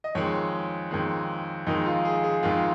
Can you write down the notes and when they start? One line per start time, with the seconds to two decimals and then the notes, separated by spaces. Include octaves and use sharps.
0.04 D#5
0.15 F2 D#3 G#3 C#5
0.91 F2 D#3 G#3
1.67 F2 D#3 G#3 D#4
1.86 F4
2.05 G#4
2.24 G#4
2.43 F2 D#3 G#3 F4